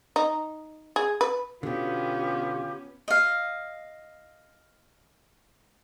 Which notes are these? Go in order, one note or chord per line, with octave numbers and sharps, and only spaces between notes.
D#4
G#4
B4
B2 D3 B3 C#4 F4 G4
D#5 F5